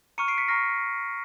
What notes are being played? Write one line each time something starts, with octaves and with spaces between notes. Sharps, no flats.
A#5 C#6 F6 C#7 D#7
C7 D7
B6 C#7
A#5 C#6 F6 A#6 C7